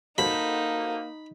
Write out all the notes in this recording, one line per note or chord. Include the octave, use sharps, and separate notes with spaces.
A#3 D#4 F#4 A4 C5 B5